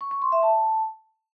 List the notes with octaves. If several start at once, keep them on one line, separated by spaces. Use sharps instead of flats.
C#6
C#6
C6
E5
A5